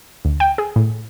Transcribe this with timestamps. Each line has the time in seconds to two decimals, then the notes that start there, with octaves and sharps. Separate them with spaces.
0.25 D2
0.40 G5
0.58 G#4
0.76 A2